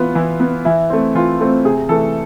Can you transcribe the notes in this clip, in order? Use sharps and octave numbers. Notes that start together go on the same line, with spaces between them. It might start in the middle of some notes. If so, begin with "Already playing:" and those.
Already playing: E3 B3 F4
E3 E4
B3
E3 E4
A3 C4
E3 F4
A3 C4
C3 G#4
E3 A3 A4